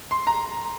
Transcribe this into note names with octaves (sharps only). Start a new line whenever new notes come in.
C6
A#5